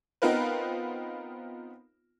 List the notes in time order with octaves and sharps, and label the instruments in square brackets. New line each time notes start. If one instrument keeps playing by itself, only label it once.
[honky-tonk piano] B3 C4 D#4 F4 A#4 B4